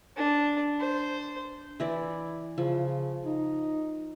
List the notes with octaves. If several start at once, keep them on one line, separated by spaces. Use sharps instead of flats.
D4
C5
E3 E4 D5
C#3 F3
D#4